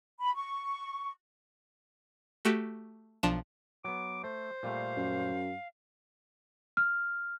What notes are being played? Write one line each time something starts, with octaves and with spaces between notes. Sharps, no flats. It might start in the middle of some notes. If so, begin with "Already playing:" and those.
B5
C#6
A3 F#4 G4
B1 F3 D4 E7
F#3 B3 D6
A3 C5
A#2 G3 A3 F5
F#2
F6